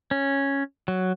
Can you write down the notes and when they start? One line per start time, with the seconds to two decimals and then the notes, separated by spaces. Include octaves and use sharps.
0.11 C#4
0.88 F#3